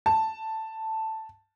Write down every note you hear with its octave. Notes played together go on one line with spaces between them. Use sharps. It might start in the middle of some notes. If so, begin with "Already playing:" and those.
A5